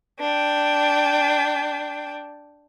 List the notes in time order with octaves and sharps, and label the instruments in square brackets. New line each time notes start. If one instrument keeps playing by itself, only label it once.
[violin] D4 G5